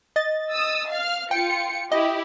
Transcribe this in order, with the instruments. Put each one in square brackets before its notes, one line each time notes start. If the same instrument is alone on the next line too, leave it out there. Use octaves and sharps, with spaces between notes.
[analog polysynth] D#5 A6
[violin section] D#6 E6
F5 F6
[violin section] F4 C#7 [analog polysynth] G5
[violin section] E4 G4 [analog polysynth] D#5